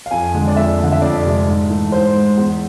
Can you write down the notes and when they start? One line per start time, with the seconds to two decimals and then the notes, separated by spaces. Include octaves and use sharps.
0.06 F5
0.11 F2 G#5
0.34 D3 G#3
0.48 D5
0.56 F2 E5
0.79 D3 A3
0.92 E5
1.02 F2 D5
1.24 C3 G#3
1.47 G#2
1.70 E3 A3
1.92 G#2 C5
2.15 G#3
2.37 E2